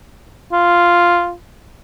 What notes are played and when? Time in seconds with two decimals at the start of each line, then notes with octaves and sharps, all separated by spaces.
0.52 F4